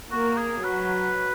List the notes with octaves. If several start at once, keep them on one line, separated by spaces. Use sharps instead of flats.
A#3 F#4
G#4
F#3 B4